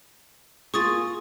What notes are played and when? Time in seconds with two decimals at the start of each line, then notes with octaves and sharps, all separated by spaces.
0.74 A#3 F4 G#4 C#6 D#6 A6